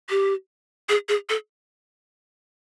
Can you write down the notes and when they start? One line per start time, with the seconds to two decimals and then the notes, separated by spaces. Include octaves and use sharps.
0.10 G4
0.89 G#4
1.09 G#4
1.29 A4